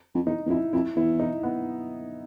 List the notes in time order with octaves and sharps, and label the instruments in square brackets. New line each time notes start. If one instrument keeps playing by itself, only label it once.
[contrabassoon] F2
[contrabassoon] E2 [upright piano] D#4
[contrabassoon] E2
[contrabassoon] F2 [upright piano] E4
[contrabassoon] F2 [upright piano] E4
[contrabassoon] E2 [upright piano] E4
[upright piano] D#4
B3